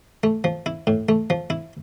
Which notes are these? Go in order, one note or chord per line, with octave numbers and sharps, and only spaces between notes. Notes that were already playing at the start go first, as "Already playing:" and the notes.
A3
F3
E4
A2
A3
F3
E4